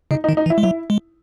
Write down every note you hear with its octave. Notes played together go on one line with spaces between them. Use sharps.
C#3 D#4
D#4
D#3
D#4
E3
E4
G#3
F#3 E4
G#3